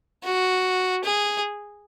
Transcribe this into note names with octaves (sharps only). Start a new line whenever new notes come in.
F#4
G#4